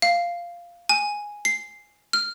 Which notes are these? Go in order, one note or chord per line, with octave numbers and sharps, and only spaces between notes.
F5
G#5
C7
F6